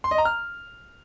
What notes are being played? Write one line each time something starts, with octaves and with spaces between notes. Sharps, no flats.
C6
D#5
A#5
F6